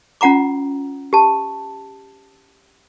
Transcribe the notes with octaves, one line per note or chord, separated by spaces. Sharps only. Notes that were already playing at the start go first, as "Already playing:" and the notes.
C#4 F4 F#5 A#5 D6
G4 A5